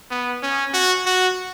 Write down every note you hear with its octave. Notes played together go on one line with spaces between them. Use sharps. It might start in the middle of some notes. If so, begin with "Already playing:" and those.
B3
C#4
F#4
F#4